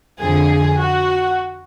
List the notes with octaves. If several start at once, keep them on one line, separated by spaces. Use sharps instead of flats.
F2 D3 F3 G#4
F#4